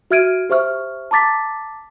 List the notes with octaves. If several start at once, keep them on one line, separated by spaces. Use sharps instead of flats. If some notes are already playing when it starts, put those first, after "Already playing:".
F#4 E5 F6 G#6 D7 D#7
G4 C5 E5 C#6 F6
A5 A#5 D6 A6 B6